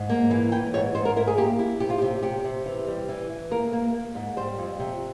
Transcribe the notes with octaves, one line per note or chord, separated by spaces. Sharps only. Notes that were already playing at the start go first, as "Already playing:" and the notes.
Already playing: G#2
A#3
E3
E3 G5
G#2 C#5
G#2 C5
A#4
E4 A#4
G#4
A#3 G4
E4
C3 G4
F4
G4
C3
C3 G4
C3
E3
G3
E3
E3
A#3 A#4
A#3
A#3
G#2
G3 C5
F2
C3